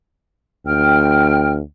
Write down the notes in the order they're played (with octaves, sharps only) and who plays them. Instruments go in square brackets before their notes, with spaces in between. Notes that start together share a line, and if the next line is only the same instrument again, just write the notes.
[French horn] D2 [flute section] G5 F6